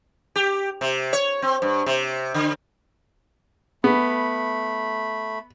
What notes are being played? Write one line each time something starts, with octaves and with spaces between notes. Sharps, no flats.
G4
C3
C#5
C4
G2
C3
D3
A3 B3 B5